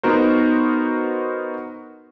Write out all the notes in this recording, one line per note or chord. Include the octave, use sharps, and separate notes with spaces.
B3 D#4 F#4 A#4 C5